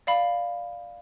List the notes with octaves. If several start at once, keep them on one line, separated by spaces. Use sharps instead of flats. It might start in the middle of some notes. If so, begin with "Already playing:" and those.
D5 F5 B5